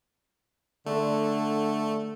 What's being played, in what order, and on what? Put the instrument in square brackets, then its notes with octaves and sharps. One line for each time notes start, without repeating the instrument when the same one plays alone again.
[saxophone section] D3 [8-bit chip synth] A3